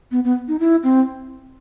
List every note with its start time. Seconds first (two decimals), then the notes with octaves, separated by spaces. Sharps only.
0.11 B3
0.24 B3
0.48 D#4
0.59 E4
0.83 C4